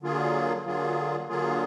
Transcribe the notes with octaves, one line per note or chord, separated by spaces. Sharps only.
D3 F#3 A#3 F4 G#4
D3 F#3 A#3 F4 G#4
D3 F#3 A#3 F4 G#4